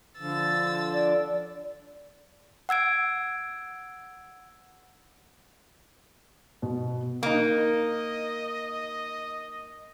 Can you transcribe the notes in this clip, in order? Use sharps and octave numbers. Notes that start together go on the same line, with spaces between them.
D3 F3 E6 A6
D5
F#5 E6 G#6 D7
B2
A#3 D#4 D#5